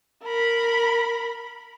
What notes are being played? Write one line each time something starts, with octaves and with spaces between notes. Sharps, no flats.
A#4 B5